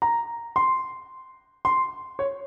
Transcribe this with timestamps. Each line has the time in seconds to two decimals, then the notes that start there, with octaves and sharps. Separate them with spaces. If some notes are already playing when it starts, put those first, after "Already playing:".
0.02 A#5
0.56 C6
1.65 C6
2.19 C#5